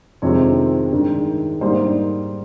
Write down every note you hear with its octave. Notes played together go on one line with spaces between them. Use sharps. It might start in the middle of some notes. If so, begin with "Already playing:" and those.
F2 C3 D#3 G#3 C4 C#5
G2 D#3 G#3
G#2 G3 A#3 D#4 C5